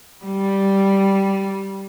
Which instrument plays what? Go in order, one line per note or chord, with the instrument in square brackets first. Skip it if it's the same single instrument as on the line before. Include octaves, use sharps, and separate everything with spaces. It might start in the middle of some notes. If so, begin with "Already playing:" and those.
[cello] G3